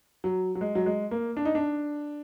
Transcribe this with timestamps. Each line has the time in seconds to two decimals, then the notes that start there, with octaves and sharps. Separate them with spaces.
0.24 F#3
0.55 F#3
0.61 G#3
0.75 F#3
0.86 G#3
1.11 A#3
1.37 D4
1.45 D#4
1.55 D4